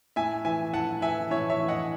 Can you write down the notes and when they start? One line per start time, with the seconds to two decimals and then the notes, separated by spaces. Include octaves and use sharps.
0.16 A2 E5 G#5
0.45 E3 E5 G#5
0.73 A2 F#5 A5
1.02 E3 E5 G#5
1.31 A2 C#5 E5
1.50 C#5 E5
1.60 E3
1.68 D#5 F#5